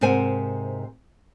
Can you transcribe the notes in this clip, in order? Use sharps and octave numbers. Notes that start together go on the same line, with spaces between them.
G#2 C3 A#4 C5 F#5 G#5